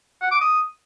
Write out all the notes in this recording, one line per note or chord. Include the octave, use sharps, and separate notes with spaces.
F#5
D6
D#6